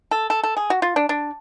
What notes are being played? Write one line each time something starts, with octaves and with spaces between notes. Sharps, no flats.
A4
A4
A4
G#4
F#4
F4
D4
D4